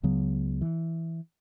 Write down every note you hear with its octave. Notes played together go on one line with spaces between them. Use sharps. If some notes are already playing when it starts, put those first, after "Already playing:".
C#2 C#3 F#3 B3
E3